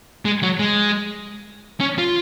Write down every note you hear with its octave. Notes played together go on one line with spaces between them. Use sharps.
G#3
F#3
G#3
C#4
F4